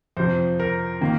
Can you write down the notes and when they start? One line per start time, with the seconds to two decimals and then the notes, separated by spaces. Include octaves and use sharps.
0.17 F2 C3 F3 C5
0.60 A#4
1.01 D#3 A#3